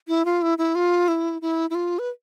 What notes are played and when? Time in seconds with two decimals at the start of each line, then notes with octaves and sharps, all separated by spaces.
0.08 E4
0.25 F4
0.42 E4
0.58 E4
0.75 F4
1.08 E4
1.42 E4
1.70 E4
1.75 F4
1.99 B4